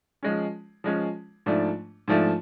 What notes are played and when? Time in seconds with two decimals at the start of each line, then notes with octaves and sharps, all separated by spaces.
0.23 F3 G#3 C#4
0.84 F3 G#3 C#4
1.46 G#2 F3 A3 D4
2.08 G#2 F3 A3 D4